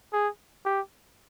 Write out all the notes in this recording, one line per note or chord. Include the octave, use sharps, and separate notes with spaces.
G#4
G4